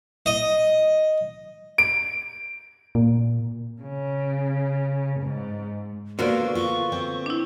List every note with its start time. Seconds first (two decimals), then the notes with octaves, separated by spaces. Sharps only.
0.26 D#5
1.78 D7
2.95 A#2
3.82 C#3
5.21 G#2
6.19 D3 A#3 B3 F4 F#4 C5 D5
6.55 F4 C#6
6.92 C4
7.26 D4 E4